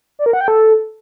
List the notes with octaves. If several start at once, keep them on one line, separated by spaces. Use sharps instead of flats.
D5
A#4
F#5
G5
A4